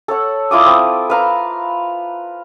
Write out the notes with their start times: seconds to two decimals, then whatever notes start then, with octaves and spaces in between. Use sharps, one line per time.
0.08 A4 C#5 F#5
0.51 E4 F4 D6 D#6
0.66 C4
1.10 B4 F5 A#5